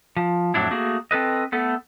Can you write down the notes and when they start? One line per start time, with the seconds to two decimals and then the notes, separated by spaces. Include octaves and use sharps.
0.17 F3
0.54 F2 A2 F#3 D4 E4
0.71 A3 A#3 F#4 G#4
1.11 C4 A4 B4 D#5
1.52 A3 B3 A4